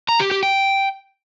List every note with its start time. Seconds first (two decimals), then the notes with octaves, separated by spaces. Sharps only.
0.09 A#5
0.20 G4
0.31 G4
0.43 G5